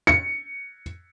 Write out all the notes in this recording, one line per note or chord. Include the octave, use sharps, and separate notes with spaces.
C#7